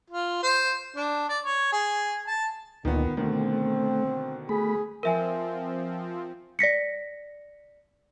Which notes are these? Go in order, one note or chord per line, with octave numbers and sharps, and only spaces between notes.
F4
C5
D4
D5
C#5
G#4
A5
D2 A#2 D#3 B3 D#4
B2 D3 D#3 A3 C4
A3 G#4 B5
F3 C4 A#4 E5 G#5
D5 A#6 B6 C#7